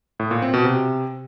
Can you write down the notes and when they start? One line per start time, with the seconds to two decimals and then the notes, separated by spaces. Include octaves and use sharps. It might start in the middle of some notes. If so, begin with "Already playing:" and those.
0.20 A2
0.31 A#2
0.42 C4
0.54 B2
0.65 C3